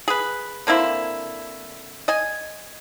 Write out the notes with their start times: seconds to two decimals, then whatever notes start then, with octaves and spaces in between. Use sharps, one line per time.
0.08 G#4 B4
0.67 D3 A#3 C4 E4
2.08 D#5 G#5